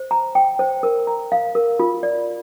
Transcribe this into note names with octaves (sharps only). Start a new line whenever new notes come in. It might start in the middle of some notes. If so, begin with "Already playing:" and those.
Already playing: C5
A#5
G5
C5
A#4
A#5
F5
A#4
F4
D5